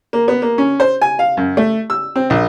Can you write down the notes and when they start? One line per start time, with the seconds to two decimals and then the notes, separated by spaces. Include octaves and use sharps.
0.13 A#3
0.28 B3
0.42 A#3
0.58 C#4
0.80 C5
1.02 G#5
1.19 F5
1.37 F#2
1.57 A3
1.90 E6
2.16 C4
2.30 A#1